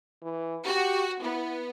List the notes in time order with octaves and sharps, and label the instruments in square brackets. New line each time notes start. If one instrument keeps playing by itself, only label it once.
[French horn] E3
[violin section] F#4 [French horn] G4
[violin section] B3 [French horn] E4